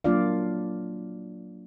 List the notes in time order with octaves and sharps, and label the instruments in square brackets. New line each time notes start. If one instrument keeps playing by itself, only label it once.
[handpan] F#3 A#3 D4 F4 D5 F5